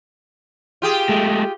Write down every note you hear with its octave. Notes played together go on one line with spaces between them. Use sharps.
F4 G4 G#4
G#3 A3